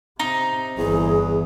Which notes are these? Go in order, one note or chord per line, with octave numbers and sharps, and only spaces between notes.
C3 D#4
G1 E2 E3 G#4